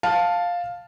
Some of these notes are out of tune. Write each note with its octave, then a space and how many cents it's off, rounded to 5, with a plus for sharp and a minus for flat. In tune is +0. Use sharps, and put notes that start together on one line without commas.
F5 +5 A5 +0